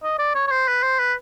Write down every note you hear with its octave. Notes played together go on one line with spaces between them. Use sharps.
D#5
D5
C#5
C#5
C5
B4
C5
B4